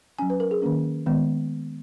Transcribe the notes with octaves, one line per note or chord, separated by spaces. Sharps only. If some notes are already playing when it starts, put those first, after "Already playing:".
F#3 C#4 G#5
B4
A#4
G#4
D#3 A#3 C#4
D#3 G#3 B3